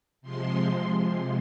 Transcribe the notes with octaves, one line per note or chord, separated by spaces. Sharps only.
C3 F3 G#3 C6
C6